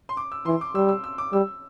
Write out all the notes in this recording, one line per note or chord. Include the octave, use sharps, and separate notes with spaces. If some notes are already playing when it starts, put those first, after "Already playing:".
C6
D6
E6
E3 C6
D6
G3 E6
E6
E6
D6
G3 E6